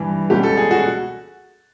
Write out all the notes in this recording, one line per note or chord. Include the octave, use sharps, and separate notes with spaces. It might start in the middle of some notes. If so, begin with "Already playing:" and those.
Already playing: G2 E3
C#2 B2 G4
A4
G#4
F#4